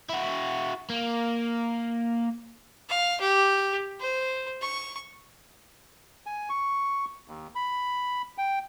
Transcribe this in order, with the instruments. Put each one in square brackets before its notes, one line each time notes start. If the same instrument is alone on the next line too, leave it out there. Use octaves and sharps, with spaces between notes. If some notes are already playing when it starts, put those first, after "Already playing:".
[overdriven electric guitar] E4 F#4
A#3
[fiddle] F5
G4
C5
C#6
[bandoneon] G#5
C#6
D#2
B5
G5